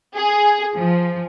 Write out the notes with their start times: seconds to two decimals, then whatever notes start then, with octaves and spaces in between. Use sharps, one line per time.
0.16 G#4
0.76 F3